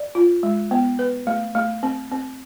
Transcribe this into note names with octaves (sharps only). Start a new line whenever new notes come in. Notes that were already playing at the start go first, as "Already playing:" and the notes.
Already playing: D5
F4
G#3
B3
B4
A3
A3
C4
C4